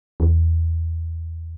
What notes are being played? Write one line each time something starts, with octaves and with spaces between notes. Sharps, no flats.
E2